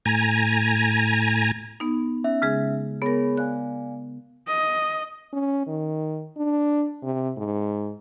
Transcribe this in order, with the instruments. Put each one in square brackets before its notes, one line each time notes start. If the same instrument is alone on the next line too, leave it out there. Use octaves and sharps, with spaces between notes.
[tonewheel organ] A2 G#5 A#5
[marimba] B3 D#4
[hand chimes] C#4 E5
[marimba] C#3 G#3 G#4
[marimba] B3 A#4 [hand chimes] G#4 C#5 B5
[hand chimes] D5 F5 G#5 [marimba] F#6
[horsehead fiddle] D#5
[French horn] C#4
D#3
D4
C3
G#2